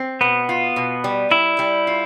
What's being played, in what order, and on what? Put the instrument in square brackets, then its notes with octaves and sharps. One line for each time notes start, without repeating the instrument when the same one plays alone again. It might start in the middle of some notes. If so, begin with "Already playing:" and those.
Already playing: [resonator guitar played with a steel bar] C4
[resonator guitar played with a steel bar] B2 [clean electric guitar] B3
[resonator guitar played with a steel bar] F4
B2
G3
[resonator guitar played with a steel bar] G3 [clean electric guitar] E4
[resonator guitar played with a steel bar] G3
F4